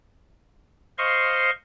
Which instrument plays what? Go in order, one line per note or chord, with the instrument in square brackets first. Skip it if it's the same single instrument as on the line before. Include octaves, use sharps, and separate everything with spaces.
[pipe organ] C5 D#5 F5 C6 C#6